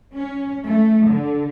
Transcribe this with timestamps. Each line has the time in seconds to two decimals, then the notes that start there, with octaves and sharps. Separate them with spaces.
0.14 C#4
0.63 A3
1.06 D3